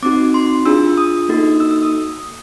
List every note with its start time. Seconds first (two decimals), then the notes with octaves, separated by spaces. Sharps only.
0.03 C4 D#4 F#4 D6
0.34 C6
0.65 D4 F4 G#4 E6
0.98 D#6
1.29 A#3 D#4 F#4 A4
1.60 E6
1.71 E6
1.82 D#6